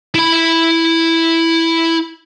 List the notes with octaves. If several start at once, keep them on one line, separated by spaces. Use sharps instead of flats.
E4 B5